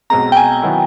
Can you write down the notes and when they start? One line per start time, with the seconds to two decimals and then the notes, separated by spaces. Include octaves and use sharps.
0.10 B1 B2 G#3 C4 A#5
0.32 G5
0.37 G#5
0.63 D#3 F#3 B3 E4